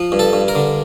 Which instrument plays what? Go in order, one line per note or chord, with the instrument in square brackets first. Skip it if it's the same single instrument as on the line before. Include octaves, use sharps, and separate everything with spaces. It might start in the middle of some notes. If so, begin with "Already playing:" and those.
Already playing: [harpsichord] F3
G2
A4
G2
A#4
D3